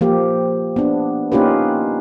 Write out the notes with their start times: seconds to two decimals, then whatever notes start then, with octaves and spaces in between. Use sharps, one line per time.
0.01 F3 A#3 G4
0.76 B3 D4
1.32 A#3 C#4 D#4 F4 G4 B4